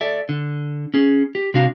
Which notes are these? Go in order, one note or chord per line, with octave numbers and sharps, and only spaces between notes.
A4 D5 E5
D3
C#4 G#4
G4
C3 D4 F#4 F5